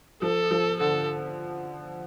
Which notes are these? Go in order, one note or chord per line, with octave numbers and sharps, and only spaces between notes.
F3 A4
F3
D3 A4